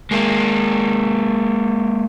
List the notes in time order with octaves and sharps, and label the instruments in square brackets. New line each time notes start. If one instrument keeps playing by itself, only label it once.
[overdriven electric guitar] G#3 A#3